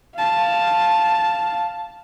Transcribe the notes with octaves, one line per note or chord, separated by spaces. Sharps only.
F5 A5